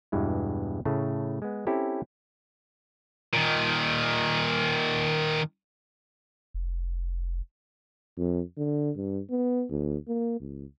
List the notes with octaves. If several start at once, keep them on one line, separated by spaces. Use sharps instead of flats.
E2 G2 B2 E3 G#3
A2 C#3 A3
G#3 B3
C4 C#4 E4 G4 A4
A#2 D#3
F1
F2
D3
G2
B3
D2
A#3
C#2